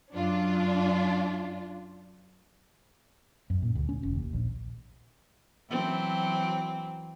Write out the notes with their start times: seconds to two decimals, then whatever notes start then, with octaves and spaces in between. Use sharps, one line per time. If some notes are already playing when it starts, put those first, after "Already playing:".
0.14 F#2 D4 F4
3.50 F#2
3.62 A#2
3.75 D2
3.89 C#4
4.03 F1
4.15 D#2
4.33 A#1
5.70 E3 F#3 C4